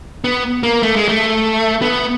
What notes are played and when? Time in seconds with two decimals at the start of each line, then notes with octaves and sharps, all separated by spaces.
0.24 B3
0.63 A#3
0.83 A3
0.96 G#3
1.08 A3
1.82 B3